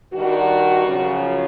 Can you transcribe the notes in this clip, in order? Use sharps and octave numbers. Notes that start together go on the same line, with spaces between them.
G2 D#3 G3 F#4
F#2 C#3 F3